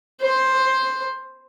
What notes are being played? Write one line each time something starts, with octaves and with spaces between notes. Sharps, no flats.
C5